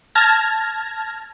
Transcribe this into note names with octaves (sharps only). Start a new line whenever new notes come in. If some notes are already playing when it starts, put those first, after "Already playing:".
A5 F6 G#6 A#6